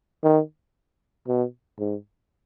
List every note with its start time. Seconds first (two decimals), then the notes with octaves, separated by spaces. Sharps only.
0.23 D#3
1.28 B2
1.79 G#2